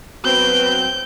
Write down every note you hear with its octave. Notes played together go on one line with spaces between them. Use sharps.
B2 F#3 C4 B4 G6